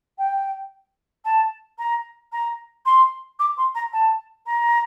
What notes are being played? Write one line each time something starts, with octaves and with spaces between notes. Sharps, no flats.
G5
A5
A#5
A#5
C6
D6
C6
A#5
A5
A#5